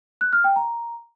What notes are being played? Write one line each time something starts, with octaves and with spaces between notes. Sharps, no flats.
F#6
F6
G5
A#5